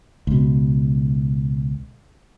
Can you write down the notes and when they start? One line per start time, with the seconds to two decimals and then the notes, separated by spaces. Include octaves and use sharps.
0.27 C#2 B2